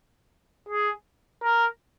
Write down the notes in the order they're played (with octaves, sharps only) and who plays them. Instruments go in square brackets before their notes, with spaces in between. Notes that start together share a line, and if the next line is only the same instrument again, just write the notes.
[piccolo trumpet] G#4
A#4